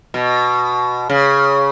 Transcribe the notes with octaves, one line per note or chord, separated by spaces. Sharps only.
B2
C#3